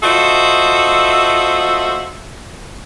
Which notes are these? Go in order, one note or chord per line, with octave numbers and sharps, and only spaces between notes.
F4 F#4 A4 C5 D#5 E5